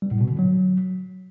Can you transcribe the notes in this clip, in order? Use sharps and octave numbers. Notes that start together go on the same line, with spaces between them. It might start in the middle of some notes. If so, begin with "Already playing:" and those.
G3
A2
B2
D3
F#3